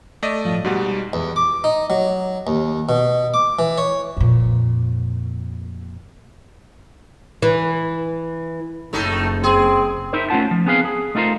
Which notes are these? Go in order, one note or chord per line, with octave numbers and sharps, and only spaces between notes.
A3 D5 D#5
A2 F3
G#2 B2 G3 F#4 G4
E2
D6
D#4
F#3
D#2
B2
D6
E3
C#5
F2 A#2
E3
F#1 A2 A3 D#4
C4 G#4
D#4 E4 A#4 C5 E5
A3 C#4 E4 F4 F#5 A5
F3
B3 C4 G#4 B4 F5
G#4
A3 D#4 F4 A#4 C5